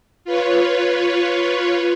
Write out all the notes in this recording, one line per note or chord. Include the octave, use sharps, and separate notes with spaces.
F4 B4 C#5